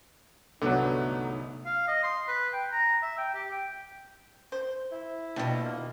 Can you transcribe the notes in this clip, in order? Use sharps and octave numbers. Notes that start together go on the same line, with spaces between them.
C2 G#2 D3 F#3 A3 B3 D#4
F5
D#5
C6
B4
G5
A#5
E5
G5
G4
G5
C5
E4
D#2 B2 D4 F4 G5
A#3